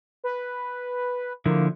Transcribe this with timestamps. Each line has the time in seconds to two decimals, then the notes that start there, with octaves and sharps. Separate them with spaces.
0.24 B4
1.46 D3 F3 A#3 E4